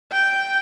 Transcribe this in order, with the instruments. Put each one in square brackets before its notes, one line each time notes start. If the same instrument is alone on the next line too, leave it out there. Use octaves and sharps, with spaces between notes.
[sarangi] G5